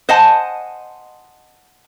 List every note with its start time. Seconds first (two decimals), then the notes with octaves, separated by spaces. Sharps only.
0.09 C5 D#5 F#5 G#5 A5